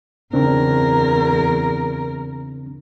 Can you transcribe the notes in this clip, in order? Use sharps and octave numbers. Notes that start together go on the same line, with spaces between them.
E2 C#3 C4 D4 A#4